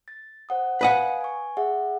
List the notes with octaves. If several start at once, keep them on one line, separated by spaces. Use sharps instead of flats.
A6
C5 F#5 D#6
B4 D#5 F5 F#5 G#5 D#6
G#5 C#6
G#4 E5 F#5